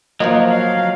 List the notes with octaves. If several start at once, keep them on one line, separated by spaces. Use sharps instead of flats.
F3 F#3 A#3 F4 C5 D#5
F5